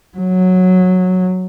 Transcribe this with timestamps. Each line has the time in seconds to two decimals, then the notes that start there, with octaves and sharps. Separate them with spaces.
0.18 F#3